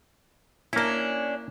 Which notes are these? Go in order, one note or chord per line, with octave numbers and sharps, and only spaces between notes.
A#3 C#4 D4 E4